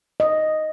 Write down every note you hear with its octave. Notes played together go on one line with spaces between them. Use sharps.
D#5